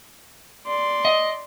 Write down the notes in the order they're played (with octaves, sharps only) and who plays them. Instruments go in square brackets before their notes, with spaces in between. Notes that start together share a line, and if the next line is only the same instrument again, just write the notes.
[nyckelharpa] D5 C6
[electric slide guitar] D#5